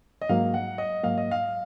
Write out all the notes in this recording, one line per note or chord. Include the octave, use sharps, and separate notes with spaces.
D#5
G#2 F#3 A#3 F5
F#5
D#5
G#2 F#3 A#3 F5
D#5
F5